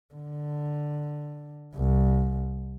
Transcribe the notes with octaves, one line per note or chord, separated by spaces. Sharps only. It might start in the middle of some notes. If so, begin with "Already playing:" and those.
D3
C2